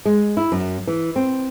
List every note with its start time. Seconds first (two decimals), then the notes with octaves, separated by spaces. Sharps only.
0.06 G#3
0.37 E4
0.52 F#2
0.87 E3
1.16 C4